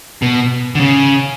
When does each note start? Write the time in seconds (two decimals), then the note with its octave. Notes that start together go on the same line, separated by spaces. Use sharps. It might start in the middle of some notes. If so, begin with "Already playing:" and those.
0.22 B2
0.75 D3
0.80 C#3